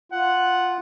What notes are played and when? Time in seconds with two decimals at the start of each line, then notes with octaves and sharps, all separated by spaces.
0.12 F4 F#5